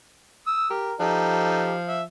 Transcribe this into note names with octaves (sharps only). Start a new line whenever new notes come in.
D#6 E6
G4 A#4
F3 D#4 G4 A4
E5